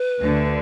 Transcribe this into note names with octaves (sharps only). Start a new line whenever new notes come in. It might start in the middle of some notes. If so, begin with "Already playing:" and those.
Already playing: B4
D2 D3